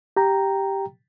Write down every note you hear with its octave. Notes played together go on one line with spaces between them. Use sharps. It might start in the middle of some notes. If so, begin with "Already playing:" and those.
G4 G5 A#5